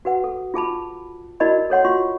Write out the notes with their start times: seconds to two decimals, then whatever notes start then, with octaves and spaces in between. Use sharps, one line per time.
0.05 F#4 B4 F#5
0.24 A4
0.54 F4 G#4 A5 B5
1.40 E4 F#4 A#4 D5 D#5 B5
1.70 A4 C#5 F#5 C6
1.85 F4 F#4 C6 C#6